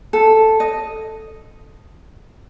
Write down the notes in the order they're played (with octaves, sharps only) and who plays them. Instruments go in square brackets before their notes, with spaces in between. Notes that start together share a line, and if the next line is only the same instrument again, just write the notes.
[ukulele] A4
D#5